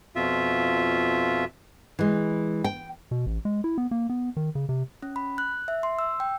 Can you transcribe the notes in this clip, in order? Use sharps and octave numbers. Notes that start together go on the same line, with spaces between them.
F2 B2 F4 E5
E3 G#3
G5
B2
A1
G#3
E4
B3
A#3
B3
D#3
C#3
C3
C#4
B5
F#6
E5
C6
E6
G5